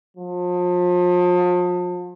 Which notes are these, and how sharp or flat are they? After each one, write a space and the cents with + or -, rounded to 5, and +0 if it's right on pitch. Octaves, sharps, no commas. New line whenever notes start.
F3 +35